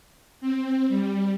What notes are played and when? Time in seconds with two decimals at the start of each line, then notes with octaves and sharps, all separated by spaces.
0.41 C4
0.89 G3